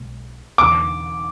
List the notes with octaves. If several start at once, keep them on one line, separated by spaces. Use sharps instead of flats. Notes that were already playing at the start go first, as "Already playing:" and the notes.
Already playing: B1 B2 G#3
E1 E2 D3 D6